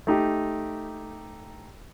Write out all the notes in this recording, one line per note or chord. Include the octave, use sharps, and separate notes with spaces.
A3 D#4 G4